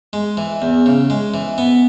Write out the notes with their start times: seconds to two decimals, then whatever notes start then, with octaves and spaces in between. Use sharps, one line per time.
0.13 G#3
0.37 E3
0.62 E2
0.86 C#3
1.10 G#3
1.34 E3
1.58 B3